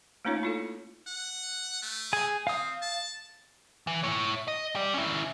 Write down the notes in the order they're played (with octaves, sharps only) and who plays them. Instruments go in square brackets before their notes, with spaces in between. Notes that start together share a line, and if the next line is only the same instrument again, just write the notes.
[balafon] A3 A#3 C#4 D#4 F4 C#5
E4 F4 A4
[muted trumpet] F#5
A3
[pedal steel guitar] G#4 G#5
[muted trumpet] C4 [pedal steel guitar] F5 D#6
[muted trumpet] A5
[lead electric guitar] E3
E4 C#5
D#5
G4 D5
C#4 E4